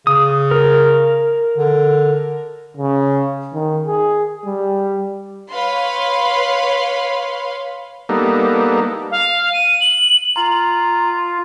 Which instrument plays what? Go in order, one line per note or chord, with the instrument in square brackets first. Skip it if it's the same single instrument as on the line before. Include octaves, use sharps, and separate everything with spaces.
[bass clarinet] C#3 [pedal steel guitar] D#6
[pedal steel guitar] A#4
[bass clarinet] D3
[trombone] C#3
D#3
G#4
G3
[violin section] B4 C#5 F5 B5 C6
[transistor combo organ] G3 A#3 B3 D#4 A4
[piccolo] F5
D#7
F#7
[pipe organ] F4 [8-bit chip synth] A#5